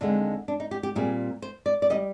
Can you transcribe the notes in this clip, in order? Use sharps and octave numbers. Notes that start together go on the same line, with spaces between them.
D#2 D3 G#3 C4 D4
D4
D#4
G4
G4
A#2 G3 C4 G#4
C5
D5
D5
D#3 G3 D#5